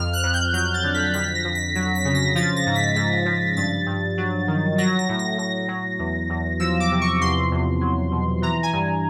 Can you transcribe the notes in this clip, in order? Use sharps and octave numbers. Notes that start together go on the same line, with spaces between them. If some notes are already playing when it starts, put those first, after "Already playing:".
Already playing: F2 F6
F#6
F2
G6
F#3 G6
A6
D3
B6
F2 B6
A#6
F2
B6
F#3 B6
B6
C#3
A#6
F3 A6
A#6
G#2
B6
G#2 A#6
F3
G2 A6
G2
F#3
D#3
F#3 A#6
A#6
A2
A#6
A2 A#6
F#3
E2
E2
F3 E6
D6
C3
C#6
E2 C6
E2
F#3
B2
E3 A#5
G#5
G2